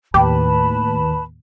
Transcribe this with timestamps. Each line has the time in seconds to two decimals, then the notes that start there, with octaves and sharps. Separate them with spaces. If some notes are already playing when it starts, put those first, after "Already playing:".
0.14 D#2 A2 G4 B4 A5 B5